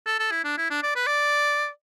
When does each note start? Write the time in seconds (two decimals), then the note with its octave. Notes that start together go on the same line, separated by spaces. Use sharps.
0.06 A4
0.19 A4
0.31 E4
0.44 D4
0.58 E4
0.70 D4
0.83 D5
0.95 B4
1.07 D5